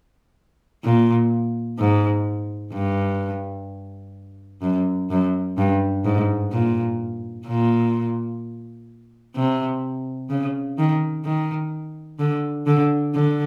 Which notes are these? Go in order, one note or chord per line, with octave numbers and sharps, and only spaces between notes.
A#2
G#2
G2
F#2
F#2
G2
G#2
A#2
A#2
C3
C#3
D#3
D#3
D3
D3
D3